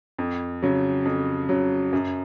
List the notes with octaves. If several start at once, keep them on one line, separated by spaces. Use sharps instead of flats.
F2
C#3 F#3
F2
C#3 F#3
F#2